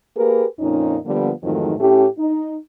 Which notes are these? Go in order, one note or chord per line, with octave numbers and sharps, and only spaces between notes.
A#3 G4 G#4 A#4 B4
F2 A#2 C#4 D#4
D3 F3 G3 A#3 B3
F2 G#2 D#3 E3 F#3 A3
A2 A3 C#4 G4
D#4